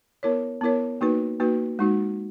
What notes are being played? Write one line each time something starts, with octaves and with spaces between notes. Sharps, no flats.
B3 E4 A#4 C#5
B3 E4 A#4 C#5
A#3 D#4 F#4 B4
A#3 D#4 F#4 B4
G#3 D#4 F#4